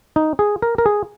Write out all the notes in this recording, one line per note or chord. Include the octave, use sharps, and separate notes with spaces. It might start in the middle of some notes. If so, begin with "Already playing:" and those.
D#4
G#4
A#4
A#4
G#4